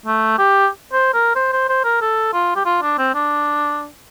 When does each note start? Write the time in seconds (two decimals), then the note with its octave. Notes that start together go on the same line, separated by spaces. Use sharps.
0.06 A3
0.38 G4
0.93 C5
1.14 A#4
1.36 C5
1.52 C5
1.69 C5
1.84 A#4
2.01 A4
2.33 F4
2.56 G4
2.65 F4
2.82 D4
2.98 C4
3.14 D4